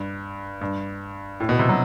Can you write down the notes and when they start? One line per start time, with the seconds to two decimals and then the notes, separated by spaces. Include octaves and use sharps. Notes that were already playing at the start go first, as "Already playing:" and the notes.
Already playing: G2
0.61 G2
1.40 A2
1.49 B2
1.59 C3
1.69 F#3